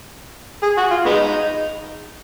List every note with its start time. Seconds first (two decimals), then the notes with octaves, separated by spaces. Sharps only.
0.63 G#4
0.78 F#4
0.91 F4
1.06 G#3 B3 D#4